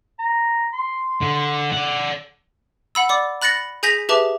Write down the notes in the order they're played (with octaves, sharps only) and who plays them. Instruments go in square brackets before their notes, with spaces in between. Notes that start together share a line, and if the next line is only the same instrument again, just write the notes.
[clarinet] A#5
C6
[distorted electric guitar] D3
D5 F#5
[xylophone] F#5 B5 E6
D5 D6
B5 F#6 A6 A#6 C#7 F#7
G#4 G#5 G6 A#6 B6 F7
G4 G#4 B4 E5 A5 D6